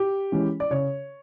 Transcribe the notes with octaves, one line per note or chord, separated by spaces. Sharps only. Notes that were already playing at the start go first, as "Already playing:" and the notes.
Already playing: G4
E3 G#3 C#4
D5
C#3 C#5